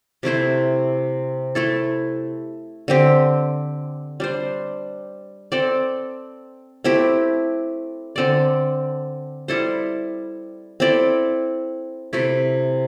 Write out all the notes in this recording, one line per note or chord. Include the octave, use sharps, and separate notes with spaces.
C3 A3 E4 C5
A3 E4 A4
D3 C4 G4
G3 D4 C5
C4 A4 D5
A3 C4 E4 G4
D3 C4 A4 D5
G3 E4 A4 C5
C4 E4 A4 D5
C3 A3 E4